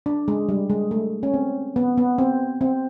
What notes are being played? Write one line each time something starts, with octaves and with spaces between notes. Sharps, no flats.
D4
G#3
G3
G#3
A3
C#4
C4
B3
B3
C4
C4